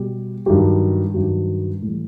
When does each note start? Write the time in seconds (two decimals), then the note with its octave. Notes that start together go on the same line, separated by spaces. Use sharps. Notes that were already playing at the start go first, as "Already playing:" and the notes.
Already playing: B2 G3 G4
0.46 G2 D#3 F#3 G4
1.14 G2 D#3 F#3
1.82 A2 E3 G3